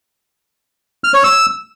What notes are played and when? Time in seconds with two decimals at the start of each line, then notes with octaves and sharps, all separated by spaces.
1.04 F6
1.14 C#5
1.24 E6